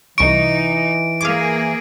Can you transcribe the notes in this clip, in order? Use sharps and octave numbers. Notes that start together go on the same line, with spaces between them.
C2 E3 D#4 C#6 D7
A#3 G#4 F5 D6